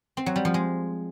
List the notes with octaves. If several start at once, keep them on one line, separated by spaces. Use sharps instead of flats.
C4
F#3
G3
F3
G#3